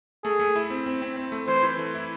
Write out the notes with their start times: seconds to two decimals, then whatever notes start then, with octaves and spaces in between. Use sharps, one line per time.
0.24 A3 G#4
0.39 A3
0.56 E4
0.70 C4
0.86 C4
1.02 C4
1.17 C4
1.32 A3
1.47 E3 C5
1.63 E3
1.79 A3
1.94 E4